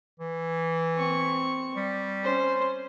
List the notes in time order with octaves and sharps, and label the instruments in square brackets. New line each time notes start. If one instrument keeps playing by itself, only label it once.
[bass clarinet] E3
[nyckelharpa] C4 C#6
[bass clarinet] G3
[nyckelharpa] C#4 C5